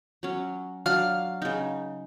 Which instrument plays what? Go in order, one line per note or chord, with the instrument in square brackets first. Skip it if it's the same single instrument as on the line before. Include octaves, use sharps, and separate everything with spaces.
[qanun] F#3 C#4
[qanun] F#3 D4 [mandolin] F5 F6
[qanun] C#3 D#4